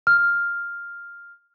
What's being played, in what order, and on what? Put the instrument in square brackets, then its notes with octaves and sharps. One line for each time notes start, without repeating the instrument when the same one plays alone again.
[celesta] F6